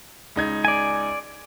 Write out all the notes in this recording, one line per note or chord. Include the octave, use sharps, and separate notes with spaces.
C#2 D#4 G#6
D5 G#5